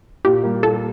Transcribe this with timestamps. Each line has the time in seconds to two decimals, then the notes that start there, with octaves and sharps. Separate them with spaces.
0.25 A#2 G4
0.43 G3 A#3
0.63 A#2 A4